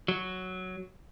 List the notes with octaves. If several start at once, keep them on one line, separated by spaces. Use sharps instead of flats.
F#3